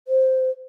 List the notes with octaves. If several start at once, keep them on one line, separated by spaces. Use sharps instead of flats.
C5